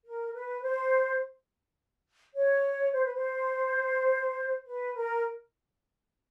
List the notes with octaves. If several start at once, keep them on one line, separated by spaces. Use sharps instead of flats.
A#4
B4
C5
C#5
C5
B4
C5
B4
A#4